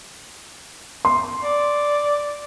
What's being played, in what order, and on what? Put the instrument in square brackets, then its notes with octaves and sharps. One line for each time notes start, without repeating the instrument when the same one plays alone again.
[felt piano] C6
[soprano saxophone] D5